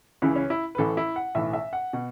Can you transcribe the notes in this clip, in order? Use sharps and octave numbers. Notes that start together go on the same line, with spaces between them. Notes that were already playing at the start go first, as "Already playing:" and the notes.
C#2 C#3 E3 E4
C#4
E4
B4
A1 A2 E3 A4
E4
F#5
B1 A2 E3 E5
E5
F#5
B2